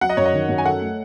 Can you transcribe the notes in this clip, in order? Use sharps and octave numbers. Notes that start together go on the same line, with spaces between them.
F#3 F#5
D#5
F#2 C#5
D#5
D#3
F#2
G#5
A4 F#5
A3